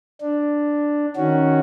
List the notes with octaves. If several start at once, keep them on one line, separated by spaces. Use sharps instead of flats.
D4
D#3 C#4 F#4